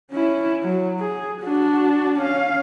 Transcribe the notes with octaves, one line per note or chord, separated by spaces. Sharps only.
C#4 E4
F#3
G#4
D4 F#4
C#4 F5